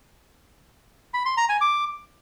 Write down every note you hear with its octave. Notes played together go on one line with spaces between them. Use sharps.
B5
C6
A#5
G#5
D6